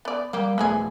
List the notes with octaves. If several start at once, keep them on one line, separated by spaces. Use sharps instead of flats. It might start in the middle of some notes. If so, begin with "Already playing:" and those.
B3 D5
G3 A#3 G4
E1 G#3 A3 B3 G#4